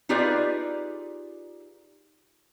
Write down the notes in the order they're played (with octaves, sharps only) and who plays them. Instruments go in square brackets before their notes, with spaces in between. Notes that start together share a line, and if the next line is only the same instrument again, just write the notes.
[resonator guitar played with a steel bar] D#4 F4 G4 G#4 B4 D5